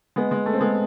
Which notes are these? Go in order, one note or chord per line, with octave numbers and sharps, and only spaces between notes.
G#3 B3
G#3
A3
C4
G#3 B3